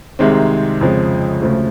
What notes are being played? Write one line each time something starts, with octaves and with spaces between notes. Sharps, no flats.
C2 C3 D#3 G#3 C4
F2 C#3 F3 G#3
D2 C#3 F3 A3